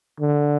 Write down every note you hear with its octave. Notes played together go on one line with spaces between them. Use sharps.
D3